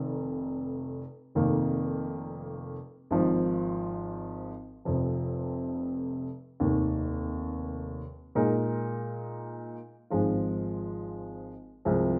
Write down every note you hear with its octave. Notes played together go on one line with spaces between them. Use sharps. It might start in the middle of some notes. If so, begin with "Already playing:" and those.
Already playing: F1 F2 D#3
F1 F2 D#3 A#3
G#1 G#2 F3
F1 F2 C3 F3
F1 D#2 D#3
A#2 G#3 D#4 A#4
G#1 G#2 F3 G#3 F4
C2 C3 F3 G#3